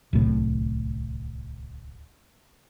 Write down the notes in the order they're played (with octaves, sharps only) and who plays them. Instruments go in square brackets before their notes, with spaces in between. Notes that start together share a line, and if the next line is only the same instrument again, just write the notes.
[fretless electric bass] D1 C2 A2